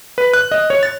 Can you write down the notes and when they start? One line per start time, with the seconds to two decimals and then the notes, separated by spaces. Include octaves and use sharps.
0.18 B4
0.34 F#6
0.51 D#5
0.70 C#5
0.83 A6